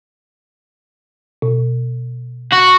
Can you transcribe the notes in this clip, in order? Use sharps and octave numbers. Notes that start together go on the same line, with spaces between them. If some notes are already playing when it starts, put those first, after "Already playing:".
B2
F#4